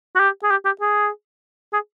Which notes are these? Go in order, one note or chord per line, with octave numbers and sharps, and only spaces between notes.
F#4
G4
G#4
G4
G4
G#4
G#4